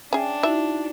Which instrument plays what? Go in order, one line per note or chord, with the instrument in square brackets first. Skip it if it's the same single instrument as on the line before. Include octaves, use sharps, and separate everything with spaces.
[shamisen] C#4 G#4 [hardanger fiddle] D4 [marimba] E5 G5
[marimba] D#4 E4 F#4 [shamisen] E5